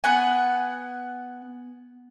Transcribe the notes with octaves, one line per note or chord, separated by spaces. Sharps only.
B3 F#5 G#5